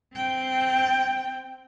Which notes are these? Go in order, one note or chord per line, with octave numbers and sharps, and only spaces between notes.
C4 G5